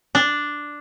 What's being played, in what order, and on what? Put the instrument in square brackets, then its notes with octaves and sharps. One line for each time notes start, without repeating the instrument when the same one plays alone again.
[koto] D4